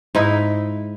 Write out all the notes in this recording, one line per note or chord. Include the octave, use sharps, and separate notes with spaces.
G#2 D#4 E4